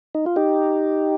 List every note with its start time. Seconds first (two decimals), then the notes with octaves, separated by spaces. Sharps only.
0.15 D#4
0.26 F4
0.36 D#4 G4